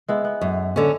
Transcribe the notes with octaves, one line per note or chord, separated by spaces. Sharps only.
G#3 B3 E4
B3
F#2
D3 C#4